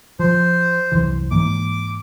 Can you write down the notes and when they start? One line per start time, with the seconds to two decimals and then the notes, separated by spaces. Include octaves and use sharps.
0.19 F3 C5
0.92 C2 F#2 E3
1.31 G#2 E3 A#3 D6